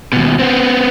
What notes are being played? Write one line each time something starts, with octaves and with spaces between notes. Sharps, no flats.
D#2 B2
B3 C4